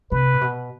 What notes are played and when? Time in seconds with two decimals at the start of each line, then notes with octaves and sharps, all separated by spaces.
0.11 C3 B4
0.34 A#2
0.41 B2